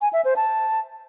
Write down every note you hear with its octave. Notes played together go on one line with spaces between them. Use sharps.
G#5
E5
C5
A5